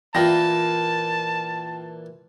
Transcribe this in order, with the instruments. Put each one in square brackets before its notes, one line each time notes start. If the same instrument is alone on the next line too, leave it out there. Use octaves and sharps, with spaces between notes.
[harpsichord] A#2 E3 [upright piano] F4 G5 A#6 [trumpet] A5